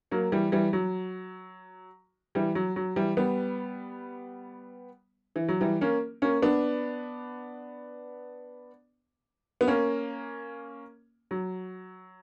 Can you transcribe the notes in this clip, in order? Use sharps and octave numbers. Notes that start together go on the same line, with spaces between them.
F#3 A#3
E3 G3
E3 G3
F#3
E3 G3
F#3
F#3
E3 G3
G3 B3
E3
F#3
E3 G3
A#3 C#4
A#3 C#4
B3 D4
B3
A#3 C#4
F#3